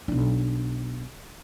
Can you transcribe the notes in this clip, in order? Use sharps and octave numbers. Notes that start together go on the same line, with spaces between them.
B1 D4